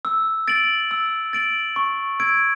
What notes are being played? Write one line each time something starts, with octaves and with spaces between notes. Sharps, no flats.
E6
A6 D7 F#7
E6
A6 D7 F#7
C#6
E6 G#6 D7